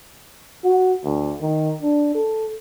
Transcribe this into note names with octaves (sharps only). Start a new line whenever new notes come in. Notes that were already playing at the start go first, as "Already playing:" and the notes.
F#4
D2
D#3
D4
A4